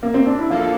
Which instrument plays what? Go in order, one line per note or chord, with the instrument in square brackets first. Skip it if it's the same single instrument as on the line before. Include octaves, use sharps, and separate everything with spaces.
[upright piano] A#3
C4
D4
E4
[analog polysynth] F3 A#3 D4 A4 [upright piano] F4